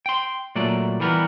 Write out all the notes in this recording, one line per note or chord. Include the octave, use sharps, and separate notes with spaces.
G5 C6
A#2 F#3 A3 D5
E3 G3 B3 A#4